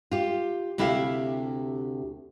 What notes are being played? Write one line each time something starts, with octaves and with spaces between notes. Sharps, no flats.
F4 G4
D2 C3 E4 G4 A4 F5